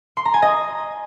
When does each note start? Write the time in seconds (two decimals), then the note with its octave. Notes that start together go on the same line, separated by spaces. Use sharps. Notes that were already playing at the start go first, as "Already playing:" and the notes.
0.17 C6
0.25 A#5
0.34 G#5
0.42 D#5